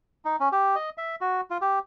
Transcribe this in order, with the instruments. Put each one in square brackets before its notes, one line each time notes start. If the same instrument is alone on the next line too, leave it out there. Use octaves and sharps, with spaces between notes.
[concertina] D#4
C#4
G4
D#5
E5
F#4
F4
G4